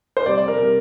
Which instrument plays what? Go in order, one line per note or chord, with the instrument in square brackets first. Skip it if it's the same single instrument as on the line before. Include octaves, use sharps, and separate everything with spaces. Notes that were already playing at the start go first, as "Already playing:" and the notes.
[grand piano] C5
C3 G3 D5
D5
A#4
C3 G3 A#4